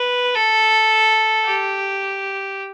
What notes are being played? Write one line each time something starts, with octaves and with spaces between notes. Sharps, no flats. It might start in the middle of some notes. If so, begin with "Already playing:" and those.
Already playing: B4
A4
G4